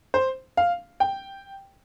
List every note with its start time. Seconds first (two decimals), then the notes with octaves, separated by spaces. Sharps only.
0.14 C5
0.57 F5
1.00 G5